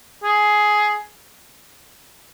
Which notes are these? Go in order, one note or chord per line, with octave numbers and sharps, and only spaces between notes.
G#4